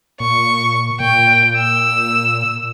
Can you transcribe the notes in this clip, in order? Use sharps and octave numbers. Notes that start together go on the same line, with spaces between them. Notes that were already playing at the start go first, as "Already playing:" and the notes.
A#2 C#6
A#2 G5
E6